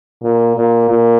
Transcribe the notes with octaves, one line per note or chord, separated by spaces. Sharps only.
A#2
A#2
A#2